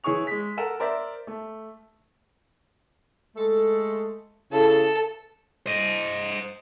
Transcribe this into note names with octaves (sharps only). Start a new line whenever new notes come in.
E3 E4 G#4 C#5 C#6 F7
G#3 B6
A4 A#4 F#5 E7
A#4 C5 D5 E5
A3
G#3 A3 A4
C#3 E4 A4
C5 D#5